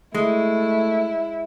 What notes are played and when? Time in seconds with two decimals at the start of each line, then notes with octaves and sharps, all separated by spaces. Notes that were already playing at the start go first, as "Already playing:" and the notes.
0.14 G#3 A3 E4